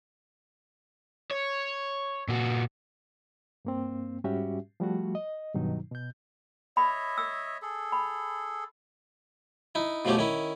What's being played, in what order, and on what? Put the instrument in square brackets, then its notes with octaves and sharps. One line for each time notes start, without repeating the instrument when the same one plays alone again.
[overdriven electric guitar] C#5
A#2 F#4
[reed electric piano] G2 A#3 C4
G#2 G3 C#4 F#4 G4 E5
F3 G3 A3 F#4
D#5
G2 B2 D#3 F#3 D#4
B2 G6
[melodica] C#5 D#5 E5 [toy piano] B5
[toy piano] E6
[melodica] G#4 A4
[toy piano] B5
[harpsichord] D#4 E4
B2 F3 A3 C#4 G4
D#3 C#4 E4